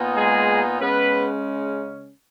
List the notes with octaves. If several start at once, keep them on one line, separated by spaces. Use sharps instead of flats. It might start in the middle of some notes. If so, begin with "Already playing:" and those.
Already playing: A#2 B3 D#4
G#3 G#4
C#3 G#3 B3 C#4 B4